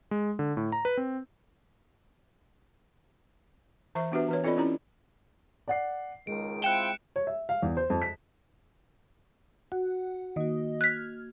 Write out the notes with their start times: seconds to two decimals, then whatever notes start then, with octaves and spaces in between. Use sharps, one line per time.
0.11 G#3
0.39 D3
0.57 A2
0.72 A#5
0.85 B4
0.97 C4
3.95 E3 C5 E5 C#6
4.12 B3 D4 F#4 G4 B4 E5
4.29 E3 B4 C#5
4.44 C4 F4 A4 D5 D#5 B5
4.57 C#4 E4 G4 A#5
5.68 D5 F#5 C7
6.27 C#2 D#3 G#3 D7
6.64 C4 E4 F4 G5 F#6 C#7 E7
7.16 C#5
7.27 E5
7.49 F5
7.62 E2
7.77 C5
7.90 F2
8.02 B6
9.72 F#4 F#5
10.36 D#3 A#3 F#4 D#5
10.81 F6 F#6 G#6 B6